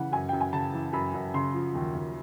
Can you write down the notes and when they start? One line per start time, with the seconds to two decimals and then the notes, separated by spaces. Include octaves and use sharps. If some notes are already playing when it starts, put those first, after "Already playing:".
Already playing: C#3 E3 F#5
0.12 F#2 G#5
0.29 F#2 G5
0.41 G#5
0.53 C#3 A5
0.74 E3
0.93 F#2 B5
1.14 F#2
1.34 C#3 C6
1.54 F3
1.75 D#2
1.95 D#2